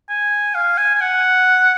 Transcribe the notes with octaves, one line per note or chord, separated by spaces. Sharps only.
G#5
F5
G#5
G#5
F#5